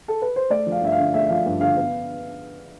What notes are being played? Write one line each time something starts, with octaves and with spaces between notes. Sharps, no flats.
A4
B4
C5
A3 D5
F3
F5
G2 E5
F5
D3
A3 E5
F3 F5
G2
D3 F5
B3